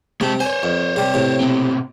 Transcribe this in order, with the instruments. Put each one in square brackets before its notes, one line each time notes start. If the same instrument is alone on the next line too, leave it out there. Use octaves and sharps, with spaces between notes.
[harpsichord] C3 [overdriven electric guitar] G#3 A5
[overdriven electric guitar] C5 C#5 [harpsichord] G#5
[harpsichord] F2
C3 G3
A2 C3
[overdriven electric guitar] B2 C4